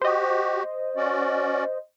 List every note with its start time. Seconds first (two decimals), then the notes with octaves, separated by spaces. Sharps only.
0.02 F#4 G4 C5 D#5
0.97 C#4 F#4 D5